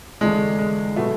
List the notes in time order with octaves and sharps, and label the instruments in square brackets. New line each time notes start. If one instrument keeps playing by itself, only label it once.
[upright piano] E2 D3 A3 D4 [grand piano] G#3
[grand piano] G#3
[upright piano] B2 F#3 B3 F#4 [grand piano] A3